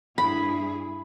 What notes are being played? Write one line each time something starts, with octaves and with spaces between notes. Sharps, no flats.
G2 E4 G#4 B5